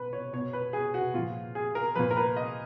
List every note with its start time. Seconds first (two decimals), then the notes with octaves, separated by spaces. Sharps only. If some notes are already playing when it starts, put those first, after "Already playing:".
Already playing: B2 B4
0.13 C#5
0.33 B2 C#5
0.53 B4
0.73 G#4
0.94 F#4
1.14 A#2 F3 F4
1.55 G#4
1.75 A#4
1.95 A#2 F3 B4
2.11 A#4
2.17 B4
2.37 D#5